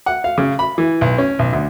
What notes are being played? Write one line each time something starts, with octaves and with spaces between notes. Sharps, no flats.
F#5
F5
C#3
B5
E3
B1
C#4
B1
D2